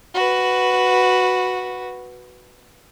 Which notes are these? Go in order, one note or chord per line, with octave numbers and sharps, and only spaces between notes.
F#4 B4